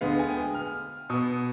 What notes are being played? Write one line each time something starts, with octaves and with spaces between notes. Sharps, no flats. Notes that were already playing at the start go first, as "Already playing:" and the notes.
D2 D3 G#3 B3 F5
G#5
G5
F6
B2 B3 D#6